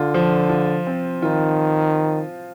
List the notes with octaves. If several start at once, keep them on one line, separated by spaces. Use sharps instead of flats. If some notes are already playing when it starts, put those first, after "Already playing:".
Already playing: D3 F4
F3
F4
C4
D#3 F4